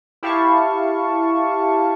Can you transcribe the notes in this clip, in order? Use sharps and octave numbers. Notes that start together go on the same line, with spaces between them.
E4 G4 F5 A5 C#6